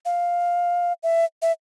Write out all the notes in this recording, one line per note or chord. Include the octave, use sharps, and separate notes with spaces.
F5
E5
E5